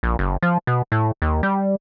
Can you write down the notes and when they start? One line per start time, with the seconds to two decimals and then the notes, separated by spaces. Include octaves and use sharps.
0.03 A#1
0.19 F#1
0.43 F3
0.67 B2
0.92 A2
1.22 D#2
1.43 G3